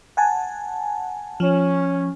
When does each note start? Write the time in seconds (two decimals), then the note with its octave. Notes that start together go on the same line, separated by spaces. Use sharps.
0.17 F#5 G#5 A5
1.40 F3 C#4